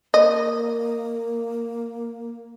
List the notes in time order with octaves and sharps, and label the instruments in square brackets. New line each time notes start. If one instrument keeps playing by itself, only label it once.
[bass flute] A#3 [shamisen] D#5